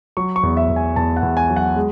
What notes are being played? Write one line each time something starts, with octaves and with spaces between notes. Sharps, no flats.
F#3 C#6
C#6
E2
E5
E2
G#5
E2 A5
F#5
E2
G#5
F#3
F#5
G#3